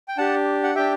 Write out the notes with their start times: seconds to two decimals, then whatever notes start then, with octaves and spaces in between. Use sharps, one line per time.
0.08 G5
0.18 D4 G4 F#5 A5
0.64 F#5
0.75 D4 G4 E5 G5